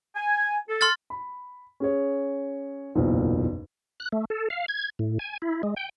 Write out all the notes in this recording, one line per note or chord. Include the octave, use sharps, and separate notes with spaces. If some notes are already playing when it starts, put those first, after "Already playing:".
G#5
A4
C6 F6 A6
B5
C#4 G#4 C#5
F#1 B1 E2 A#2 F#3 C5
F#6
A3
A4
F5
G#6
A2
G#5
E4
G#3
G5